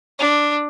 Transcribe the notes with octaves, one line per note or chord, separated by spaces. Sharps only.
D4